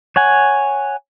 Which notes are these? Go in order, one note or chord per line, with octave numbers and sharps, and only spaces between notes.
C#5 F#5 G#5